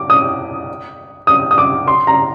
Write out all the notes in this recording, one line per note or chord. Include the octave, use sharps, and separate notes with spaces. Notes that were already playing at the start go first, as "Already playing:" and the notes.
Already playing: D6
D#6
D#6
D#6
D6
C6
A#5